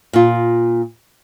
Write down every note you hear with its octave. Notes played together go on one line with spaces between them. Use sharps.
A#2 F4